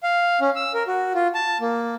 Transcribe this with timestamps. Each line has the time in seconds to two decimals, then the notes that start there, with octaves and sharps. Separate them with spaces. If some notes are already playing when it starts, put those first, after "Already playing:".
0.03 F5
0.41 C#4
0.56 E6
0.74 A#4
0.87 F#4
1.15 F4
1.35 A5
1.60 A#3